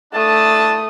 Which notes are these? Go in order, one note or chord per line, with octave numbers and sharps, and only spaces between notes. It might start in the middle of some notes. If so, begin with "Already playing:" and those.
A3 D4 E4 A5 D#6